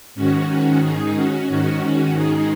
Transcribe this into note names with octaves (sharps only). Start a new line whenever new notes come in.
G#2 D#3 C#4 F#4
C#4 F#4
D#4 G#4
C#4 F#4
G#2 D#3 C#4 F#4
D#4 G#4